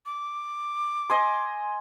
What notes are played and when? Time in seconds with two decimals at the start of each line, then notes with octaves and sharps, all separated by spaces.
0.06 D6
1.10 D#5 G#5 C6